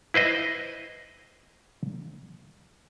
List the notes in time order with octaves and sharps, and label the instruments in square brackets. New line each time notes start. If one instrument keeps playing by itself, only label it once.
[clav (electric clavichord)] E4 B4 C5 D#5